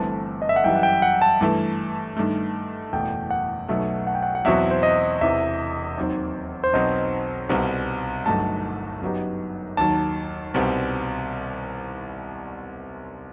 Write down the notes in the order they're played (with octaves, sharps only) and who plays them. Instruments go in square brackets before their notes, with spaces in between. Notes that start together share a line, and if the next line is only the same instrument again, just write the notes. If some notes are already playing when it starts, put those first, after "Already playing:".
Already playing: [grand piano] G1 G2 E3 A3 C4 [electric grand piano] A5
[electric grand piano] D#5
E5
F#5
[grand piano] F#2 E3 G3 [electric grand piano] G5
[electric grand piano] F#5
G5
F#5
A5
[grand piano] G2 E3 A3
G2 D#3 A3
[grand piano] F#1 E2 B2 A3 [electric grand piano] G5
[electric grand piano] F#5
[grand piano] B1 B2 F#3 A3 [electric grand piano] E5
[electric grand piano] F#5
G5
F#5
F#5
[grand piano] E2 B2 F#3 C4 F#4 [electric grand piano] E5
[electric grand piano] C5
D#5
[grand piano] E1 E2 C3 E3 [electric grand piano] E5
[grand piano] D#2 D#3 F#3 C4
[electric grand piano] C5
[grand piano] B1 B2 F#3 C4 [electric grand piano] D#5
[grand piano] C2 B2 G3 C4
[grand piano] G1 G2 F#3 A3 D#4 [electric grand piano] A5
[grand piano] F#2 F#3 B3 D#4 G4
[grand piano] D#2 D#3 F#3 [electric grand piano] A5
[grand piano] C2 B2 G3 C4